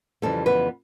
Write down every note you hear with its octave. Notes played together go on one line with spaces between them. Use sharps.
F2 C#3 E3 G3 A3 A4
B3 B4